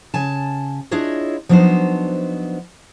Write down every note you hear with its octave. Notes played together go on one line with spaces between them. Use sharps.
C#3 G#5 A5
D4 E4 F4 G#4 C#5 D#5
F3 F#3 B3 D4 D#4 C5